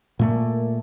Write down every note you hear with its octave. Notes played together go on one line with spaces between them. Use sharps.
A#2 A3 A#3